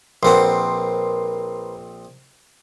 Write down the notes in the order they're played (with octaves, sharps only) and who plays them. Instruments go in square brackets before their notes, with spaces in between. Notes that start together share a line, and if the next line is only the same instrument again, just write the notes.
[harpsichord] A#1 C4 F#5 [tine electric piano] A#4 B4 C6